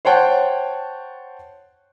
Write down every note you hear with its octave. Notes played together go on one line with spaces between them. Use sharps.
C5 C#5 F#5 G5 A5